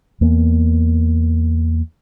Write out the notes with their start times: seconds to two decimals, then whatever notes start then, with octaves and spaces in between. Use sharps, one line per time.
0.21 E2 A#3 B3